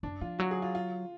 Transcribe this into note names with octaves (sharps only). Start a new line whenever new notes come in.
F#2 D4
F3 F4
F#3 F#4
G#4
F4
F4